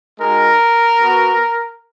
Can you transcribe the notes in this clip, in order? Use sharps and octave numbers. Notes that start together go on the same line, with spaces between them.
G#3 D#4 F#4 A#4
B3 F#4